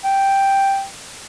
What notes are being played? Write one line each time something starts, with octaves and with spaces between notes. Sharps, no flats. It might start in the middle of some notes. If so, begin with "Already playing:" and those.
G5